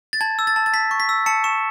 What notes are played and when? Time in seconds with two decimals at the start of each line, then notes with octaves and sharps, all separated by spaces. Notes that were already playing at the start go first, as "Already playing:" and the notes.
0.13 A6
0.21 A5 G#6
0.39 E6
0.47 A6
0.56 A5
0.66 A6
0.74 A5 B6
0.91 C#6
1.00 B6
1.09 E6
1.26 A5 C#7
1.44 C#6 E7